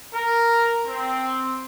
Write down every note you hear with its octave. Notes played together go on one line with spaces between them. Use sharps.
A#4
C4